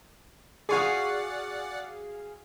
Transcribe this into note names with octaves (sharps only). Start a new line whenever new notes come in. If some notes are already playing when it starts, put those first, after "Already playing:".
F#4 G#4 D5 F5 F#5 C#6 C7